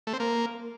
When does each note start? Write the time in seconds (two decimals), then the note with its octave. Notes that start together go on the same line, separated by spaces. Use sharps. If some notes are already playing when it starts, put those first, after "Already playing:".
0.07 A3
0.13 C4
0.20 A#3